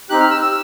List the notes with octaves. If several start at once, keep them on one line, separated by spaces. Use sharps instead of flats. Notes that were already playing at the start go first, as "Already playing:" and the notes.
C4 D#4 G4 F#6
F6
E6
E6